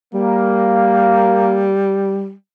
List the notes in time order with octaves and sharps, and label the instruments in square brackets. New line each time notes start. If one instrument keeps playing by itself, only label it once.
[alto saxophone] G3 [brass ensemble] A#3